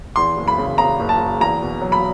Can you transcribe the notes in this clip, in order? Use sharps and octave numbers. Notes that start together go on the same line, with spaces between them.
E2 C6
F#1
B5
C#3
C#3 A#5
F#1
A5
F#1
E2 A#5
B2
F#3
B5